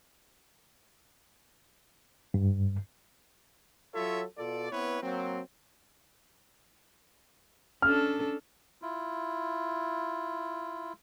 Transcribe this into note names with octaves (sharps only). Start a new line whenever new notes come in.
G2
F#3 F4 A4 C#5 E5
B2 F4 A4 D5
B3 C4 E4 B4 C#5
F#3 A#3 C4
C#4 D4 A4 F6
E4 F4